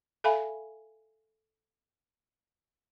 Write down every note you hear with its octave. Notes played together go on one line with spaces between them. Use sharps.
A4 E5 F5 G#5 B5